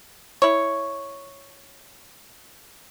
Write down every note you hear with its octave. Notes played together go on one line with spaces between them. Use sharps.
E4 C#5